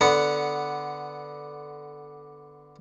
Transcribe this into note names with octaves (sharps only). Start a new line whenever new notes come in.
D3 B3 F#5